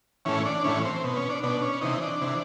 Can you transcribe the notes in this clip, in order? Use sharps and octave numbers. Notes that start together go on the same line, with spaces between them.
A2 E3 C#4
D4
A2 E3 C#4
C4
B2
C#4
D4
B2 D4
C#4
C3 E3 D#4
D4
C3 E3